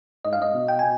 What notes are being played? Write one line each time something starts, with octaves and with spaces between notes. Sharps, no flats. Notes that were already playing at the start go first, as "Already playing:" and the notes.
G#2 D#5
G2 F5
G#2 D#5
B2
G5
B2 G#5